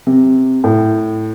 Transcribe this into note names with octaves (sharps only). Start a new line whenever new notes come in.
C3
A2